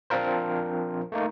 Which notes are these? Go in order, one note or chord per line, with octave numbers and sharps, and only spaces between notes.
F3 C4 D4 F4 A#4 C5
A3 A#3 D#4